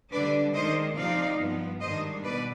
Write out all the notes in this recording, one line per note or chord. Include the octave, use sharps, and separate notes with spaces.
D3 G3 D4 B4 D5
D#3 G#3 D4 C5 D#5
C3 F3 C4 D#4 D5 F5
G2 F3 B3
G#2 D#3 G3 D4 C5 D#5
B2 B4 D5